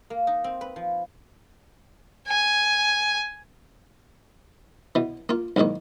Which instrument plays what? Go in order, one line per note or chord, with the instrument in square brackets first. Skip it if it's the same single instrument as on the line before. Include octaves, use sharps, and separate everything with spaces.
[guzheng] A#3
D#4
C4
B4
F3
[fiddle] G#5
[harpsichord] B2 E3
A#3 F4
B1 E2 G#2 D#3 A#3